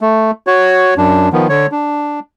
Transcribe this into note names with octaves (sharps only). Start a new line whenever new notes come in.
A3
F#4 C#5
F#2 D4
D#3 F3 B3
D3 C#5
D4